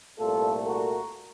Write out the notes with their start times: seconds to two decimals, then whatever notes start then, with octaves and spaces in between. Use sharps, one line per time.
0.19 C2 A#2 A3 F4 A4
0.66 F#4 A#4